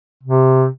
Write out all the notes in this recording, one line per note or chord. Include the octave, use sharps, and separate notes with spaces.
C3